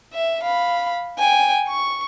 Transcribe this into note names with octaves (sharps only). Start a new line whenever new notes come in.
E5
F5 B5
G5 G#5
C#6